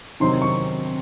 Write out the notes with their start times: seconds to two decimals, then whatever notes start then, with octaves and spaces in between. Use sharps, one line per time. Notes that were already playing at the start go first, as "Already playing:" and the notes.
0.20 C3 D#3 F#3 C4 D#4 C6
0.42 C#6